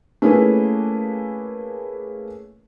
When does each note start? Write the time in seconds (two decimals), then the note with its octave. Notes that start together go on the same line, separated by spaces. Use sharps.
0.22 A3 A#3 C#4 E4 G#4 B4